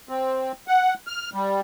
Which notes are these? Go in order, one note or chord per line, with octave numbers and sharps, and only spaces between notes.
C4
F#5
F6
G3